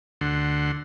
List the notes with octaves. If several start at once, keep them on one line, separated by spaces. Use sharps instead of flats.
D2 D3 F#5 C6